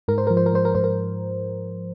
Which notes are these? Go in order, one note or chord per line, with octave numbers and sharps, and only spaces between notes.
G#2 A#4
C5
F3 A#4
C5
A#4
G#2 C5
A#4
G#2 C5
A#4